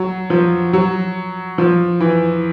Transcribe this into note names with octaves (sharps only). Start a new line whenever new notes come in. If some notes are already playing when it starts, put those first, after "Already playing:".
Already playing: F#3
F3
F#3
F3
E3